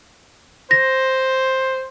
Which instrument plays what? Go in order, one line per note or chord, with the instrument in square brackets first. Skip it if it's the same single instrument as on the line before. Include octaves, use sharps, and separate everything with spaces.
[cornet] C5 [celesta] A#6